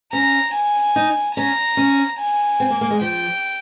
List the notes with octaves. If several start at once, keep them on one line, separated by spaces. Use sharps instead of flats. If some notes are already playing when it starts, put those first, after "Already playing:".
C#4 A#5
G#5
D#4
C#4 A#5
C#4
G#5
C4
A#3
A#3
G#3
F3 G5